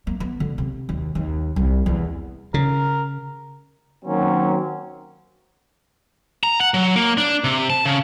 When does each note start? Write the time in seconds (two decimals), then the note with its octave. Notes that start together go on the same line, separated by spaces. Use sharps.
0.07 A#3
0.20 B3
0.40 D3
0.58 C3
0.89 D#2
1.15 D#2
1.56 C2
1.86 E2
2.54 C#3 A#4
4.05 D#3 F#3 A#3 C4 C#4
6.43 A#5
6.61 F#5
6.74 F#3
6.96 A#3
7.17 D4
7.44 C3
7.70 A5
7.86 C#3